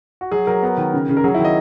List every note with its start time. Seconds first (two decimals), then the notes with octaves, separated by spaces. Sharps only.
0.21 F#4
0.32 F#3 G#4
0.47 F#3 A#4
0.63 B3
0.78 D#3
0.94 C#3
1.09 C#3
1.17 A#4
1.24 F#3 G#4
1.34 E4
1.39 D#3
1.45 D#5